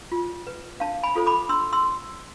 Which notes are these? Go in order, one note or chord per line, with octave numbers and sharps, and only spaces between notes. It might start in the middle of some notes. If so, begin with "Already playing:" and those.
F4
B4
D4 F5 A5
G#5 B5
F4 A4 C5
B5 D6
D4 C6 E6
C6 E6